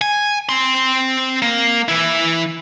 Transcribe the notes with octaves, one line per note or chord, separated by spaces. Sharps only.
G#5
C4 C6
A#3
E3 E4